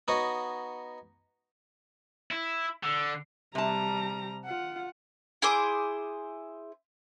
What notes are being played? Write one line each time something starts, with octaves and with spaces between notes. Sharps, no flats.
B3 D#4 F#4 C#5 D#5
E4
D3
C3 G3 A5 A#5
F4 F#5
E4 G#4 C5 D6